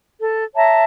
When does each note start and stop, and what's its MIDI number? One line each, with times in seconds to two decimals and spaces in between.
0.21 0.44 69
0.55 0.84 73
0.55 0.84 76
0.55 0.84 81
0.55 0.84 82